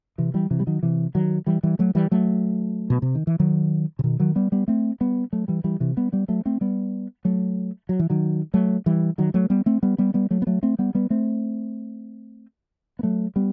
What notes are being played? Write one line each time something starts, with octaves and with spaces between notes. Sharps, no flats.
C3 E3
E3 G3
C3 E3
G3
D#3 F#3
C3 E3
D#3 F#3
E3 G3
E3 G3
F#3 A3
E3 G3
F#3 A3
B2
C3
D#3
E3
D#3 F#3
C3
B2 D#3
D#3 F#3
G3 B3
G3 B3
A3 C4
G3 B3
F#3 A3
E3 G3
E3 G3
C3 E3
G3 B3
G3 B3
F#3 A3
A3 C4
G3 B3
F#3 A3
F#3
E3
D#3 F#3
F#3 A3
E3 G3
D#3 F#3
F#3 A3
G3 B3
A3 C4
G3 B3
G3 B3
G3 B3
F#3 A3
B3
F#3 A3
A3 C4
G3 B3
G3 B3
A3 C4
B3
F#3 A3
G3 B3